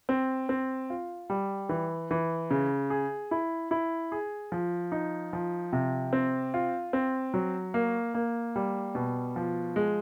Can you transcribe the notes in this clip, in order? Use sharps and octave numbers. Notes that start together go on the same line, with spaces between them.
C4
C4
F4
G3
E3
E3
C#3
G#4
E4
E4
G#4
F3
D#4
F3
C3
C4
F4
C4
F#3
A#3
A#3
G3
B2
F3
G#3